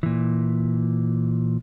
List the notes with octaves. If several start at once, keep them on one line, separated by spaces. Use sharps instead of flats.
A#2 E3